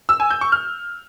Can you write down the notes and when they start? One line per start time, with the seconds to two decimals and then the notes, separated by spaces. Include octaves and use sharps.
0.09 E6
0.20 G#5
0.31 G6
0.41 C#6
0.52 F6